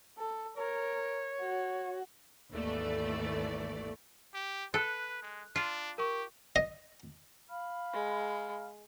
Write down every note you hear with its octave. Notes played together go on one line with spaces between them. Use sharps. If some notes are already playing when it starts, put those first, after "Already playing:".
A4
A#4 C#5
F#4
G#1 D#2 E3 A3 D5
G4
A4 B4 F#6
G#3
D4 F4
G4 A#4 C#6
D#5
F5 B5 F6
G#3